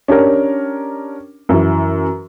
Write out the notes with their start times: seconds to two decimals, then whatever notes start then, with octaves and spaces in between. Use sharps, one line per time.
0.08 C#4 D4 G4 A#4
1.49 F#2 E3